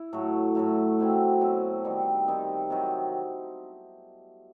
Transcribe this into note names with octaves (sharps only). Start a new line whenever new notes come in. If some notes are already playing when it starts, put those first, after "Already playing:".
Already playing: E4
A2 F#3 A3
A2 F#3 A3
B2 F#3 C4 E4
B2 F#3 C4 E4
D#3 G3 C4 D#4
D#3 G3 C4 D#4
C3 D#3 F#3